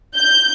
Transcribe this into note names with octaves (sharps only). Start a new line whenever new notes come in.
G6